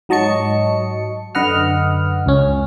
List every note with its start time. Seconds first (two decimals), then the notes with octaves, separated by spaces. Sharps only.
0.09 G#2 F#3 D#5 A5 C#6 C#7
1.35 F#2 D3 B4 D#5 F#5 F6
2.26 C#2 C#4